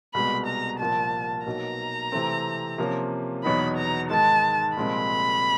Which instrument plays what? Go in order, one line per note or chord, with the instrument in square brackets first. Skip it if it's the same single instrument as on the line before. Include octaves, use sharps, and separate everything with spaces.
[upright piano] C2 B2 G#3 B3 [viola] B5
[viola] A#5
[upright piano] C2 A#2 F3 A#3 [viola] A5
[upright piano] B1 B2 F#3 A#3 [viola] A#5
[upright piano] C3 E3 A3 C4
C3 F3 A#3 C#4
[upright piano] E2 B2 F#3 B3 D#4 [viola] B5
[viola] A#5
[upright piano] G#2 D#3 G#3 [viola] A5
[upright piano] C2 A#2 F3 G#3 C4 [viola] B5